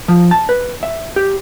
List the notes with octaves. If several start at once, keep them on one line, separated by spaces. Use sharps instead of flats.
F3
A5
B4
E5
G4